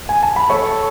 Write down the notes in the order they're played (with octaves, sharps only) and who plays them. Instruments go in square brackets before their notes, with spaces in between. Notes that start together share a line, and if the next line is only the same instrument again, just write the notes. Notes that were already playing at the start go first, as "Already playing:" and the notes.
[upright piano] G#5
A5
B5
[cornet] A4 [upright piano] C#5 C#6